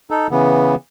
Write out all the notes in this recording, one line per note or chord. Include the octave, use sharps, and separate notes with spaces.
D#4 A4
C#3 E3 B3